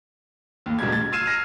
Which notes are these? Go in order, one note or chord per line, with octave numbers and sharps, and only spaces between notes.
D#2 A2
E1 D2 B2 G3 G#6
A6
E6 F6 G#6 C7 D#7 E7
F6 A#6 C7